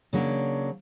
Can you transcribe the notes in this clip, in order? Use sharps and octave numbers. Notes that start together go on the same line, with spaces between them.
C#3 F#3 A#3 D4